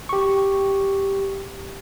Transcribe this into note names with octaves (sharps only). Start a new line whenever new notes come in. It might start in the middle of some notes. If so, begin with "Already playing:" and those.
G4 C#6